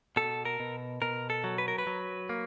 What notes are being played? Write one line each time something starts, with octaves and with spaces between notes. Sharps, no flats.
B2 A4
A#4
B2
B2 A#4
A4
F#3
B4
A#4
B4
F#3
A#3